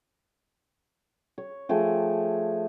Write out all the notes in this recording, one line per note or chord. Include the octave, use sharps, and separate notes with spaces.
C#5
F3 A3 G#4 G5